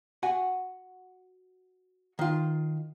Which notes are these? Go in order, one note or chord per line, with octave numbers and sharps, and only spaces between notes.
F#4 F#5 G#5
D#3 F4